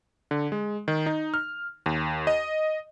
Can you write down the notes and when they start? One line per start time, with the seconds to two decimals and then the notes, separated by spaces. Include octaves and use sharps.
0.31 D3
0.52 G#3
0.88 D#3
1.06 D#4
1.34 F6
1.86 D#2
2.27 D#5